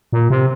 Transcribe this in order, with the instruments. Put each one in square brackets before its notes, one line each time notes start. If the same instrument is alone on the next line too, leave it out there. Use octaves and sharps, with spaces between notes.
[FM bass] A#2
C3